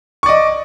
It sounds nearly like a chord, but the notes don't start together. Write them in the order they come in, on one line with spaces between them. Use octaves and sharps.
C#6 D5 D#5